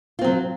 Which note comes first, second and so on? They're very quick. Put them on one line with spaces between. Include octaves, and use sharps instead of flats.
F4 C4 F#3